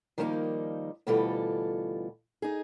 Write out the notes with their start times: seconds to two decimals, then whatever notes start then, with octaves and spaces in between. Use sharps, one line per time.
0.18 D#3 F3 G3 A#3 C#4 D#4
1.07 D2 B2 E3 G3 F4 A4
2.42 D#4 G#4